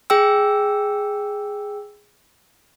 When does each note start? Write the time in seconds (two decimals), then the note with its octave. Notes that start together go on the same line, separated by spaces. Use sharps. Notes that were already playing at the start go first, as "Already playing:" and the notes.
0.10 G#4 G5 E6